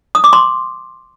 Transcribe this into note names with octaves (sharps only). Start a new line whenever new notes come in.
D#6
D6
C6